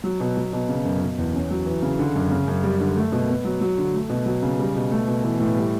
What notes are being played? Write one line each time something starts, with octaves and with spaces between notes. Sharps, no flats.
F#3
B2
F#3
B2
C#3
F#2
B2
E2
C#4
F#3
E3
C#3
D3
F#2
C#3
F#2
G3
D3
A3
B2
B3
F#3
F#3
D3
A3
B2
F#3
C#3
G3
B2
A3
B2
E3
A2
G3